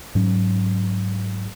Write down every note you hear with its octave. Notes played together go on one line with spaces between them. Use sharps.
G#2 F#3 C#4